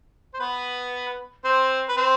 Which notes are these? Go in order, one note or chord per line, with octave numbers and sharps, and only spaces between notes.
C5
B3 B4
C4 C5
B4
C4 C5